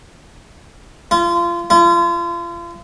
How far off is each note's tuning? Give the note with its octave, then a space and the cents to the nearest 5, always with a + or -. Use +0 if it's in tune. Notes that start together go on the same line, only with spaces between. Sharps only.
F4 -30
F4 -40